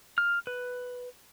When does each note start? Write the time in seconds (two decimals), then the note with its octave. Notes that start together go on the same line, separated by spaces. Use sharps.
0.18 F6
0.47 B4